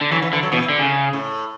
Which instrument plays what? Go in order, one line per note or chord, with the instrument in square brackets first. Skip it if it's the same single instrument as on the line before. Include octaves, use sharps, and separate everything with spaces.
[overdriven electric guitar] D3
[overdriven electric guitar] E3 [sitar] F#3
[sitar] E3
[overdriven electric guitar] D3 [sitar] E3
[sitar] F#3
[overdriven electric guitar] B2 [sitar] E3
[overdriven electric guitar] D3
C#3
[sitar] A2